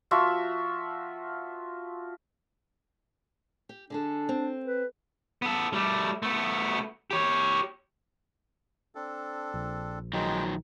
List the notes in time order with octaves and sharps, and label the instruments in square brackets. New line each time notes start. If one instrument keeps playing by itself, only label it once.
[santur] F3 F4 F#4 E5
[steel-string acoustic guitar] G4
[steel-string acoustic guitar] D3 G#4 A4 [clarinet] D4
[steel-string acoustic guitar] C4
[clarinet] B4
[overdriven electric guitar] B3 A4
G3 A3
A3 B3
G4 C#5
[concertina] C4 D4 A4
[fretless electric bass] A#1
[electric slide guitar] D#3 F#3 [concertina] G#3 D#4 G5